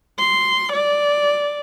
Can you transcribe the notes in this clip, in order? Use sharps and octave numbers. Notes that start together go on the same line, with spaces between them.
C6
D5